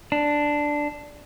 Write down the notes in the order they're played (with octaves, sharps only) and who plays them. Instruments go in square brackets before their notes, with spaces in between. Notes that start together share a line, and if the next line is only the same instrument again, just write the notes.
[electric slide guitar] D4